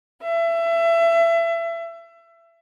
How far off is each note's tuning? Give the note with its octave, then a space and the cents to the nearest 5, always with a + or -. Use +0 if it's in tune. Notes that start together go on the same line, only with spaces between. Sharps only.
E5 +25